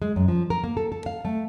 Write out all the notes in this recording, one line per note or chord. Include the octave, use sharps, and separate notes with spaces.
G#3
F#2
F3
A#4
A#3
A4
A4
F5
A3